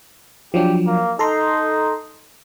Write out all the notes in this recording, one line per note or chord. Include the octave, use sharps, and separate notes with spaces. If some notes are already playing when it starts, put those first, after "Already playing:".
F3 F#3 D4 G4
A#3
D#4 A4 A#5 C6